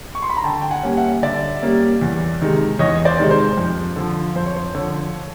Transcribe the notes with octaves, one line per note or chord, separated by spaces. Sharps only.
C#6
C6
B5
A#5
D3 G5 A5
G5
F#5 G#5
G3 A#3 C#4
E5 F#5
D3 D5 E5
G3 A#3 C#4
E2
C3 D#3 G#3
E2 C#5 D#5
C5 D5
C3 D#3 G#3
C5
F2
D3 F3
F2 C5
C#5
C5
D3 F3 C#5